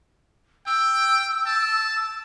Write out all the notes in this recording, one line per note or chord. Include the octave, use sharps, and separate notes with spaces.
G5 E6
A5